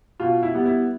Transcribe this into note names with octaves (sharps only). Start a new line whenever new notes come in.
B2 F4
E4
G3 B3
E4